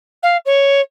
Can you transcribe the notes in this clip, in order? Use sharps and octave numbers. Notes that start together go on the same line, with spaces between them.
F5
C#5